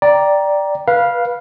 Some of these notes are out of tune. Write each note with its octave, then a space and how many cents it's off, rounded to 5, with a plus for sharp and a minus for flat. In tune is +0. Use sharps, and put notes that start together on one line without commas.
D5 +0 G5 -5 A#5 +10
B4 -20 F5 +0